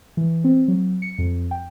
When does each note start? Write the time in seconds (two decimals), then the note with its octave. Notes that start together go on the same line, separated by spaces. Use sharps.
0.17 E3
0.44 C4
0.68 F#3
1.02 C#7
1.18 F2
1.51 G5